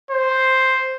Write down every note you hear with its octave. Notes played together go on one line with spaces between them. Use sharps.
C5